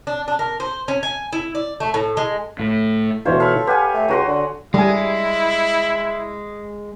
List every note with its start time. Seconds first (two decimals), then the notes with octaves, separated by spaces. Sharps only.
0.07 D4
0.28 D4
0.39 A#4
0.60 C5
0.88 C#4
1.03 G#5
1.33 E4
1.55 D5
1.80 A3
1.94 A2
2.17 G#3
2.59 A2
3.25 D2 B2 E3 F4 C5 C#5
3.40 A4 F5 B5 C#6
3.67 G4 B4 F5 F#5 G#5
3.94 A3
4.08 C#2 F#3 F#4 C6
4.27 D3
4.74 G3 G#3 E4 G#5